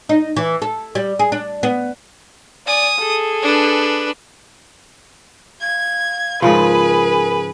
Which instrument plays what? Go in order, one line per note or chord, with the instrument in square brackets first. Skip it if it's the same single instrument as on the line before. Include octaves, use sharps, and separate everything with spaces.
[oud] D#4
E3
A4
G3
G#4
D4
B3
[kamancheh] D5 G#5 [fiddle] D#6
[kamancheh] G#4 A4
[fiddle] D4 B4
[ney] F5 [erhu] G#6
[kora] G#2 C#3 F3 [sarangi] G#4 [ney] A#4 [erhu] B4